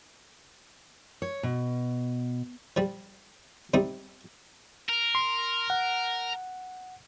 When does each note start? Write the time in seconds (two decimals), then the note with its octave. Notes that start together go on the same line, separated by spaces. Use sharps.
1.22 C#5
1.43 B2
2.77 F3 G3
3.74 C3 G3 D#4
4.89 A#4
5.15 C6
5.70 F#5